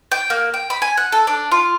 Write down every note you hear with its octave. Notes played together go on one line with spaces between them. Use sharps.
G5
A#3
G5
B5
G#5
F#5
A4
D4
F4